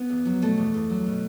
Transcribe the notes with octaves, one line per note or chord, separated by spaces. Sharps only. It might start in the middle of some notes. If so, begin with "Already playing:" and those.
Already playing: B3
E2
F#3
B2 A3
E2
E2
F#3
B2